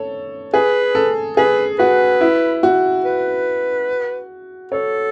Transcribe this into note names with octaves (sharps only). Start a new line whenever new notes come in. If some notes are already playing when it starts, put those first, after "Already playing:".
Already playing: A4 C#5
G#4 B4
A4
G#4 B4
F#4 B4
E4
F#4
B4
A4 C#5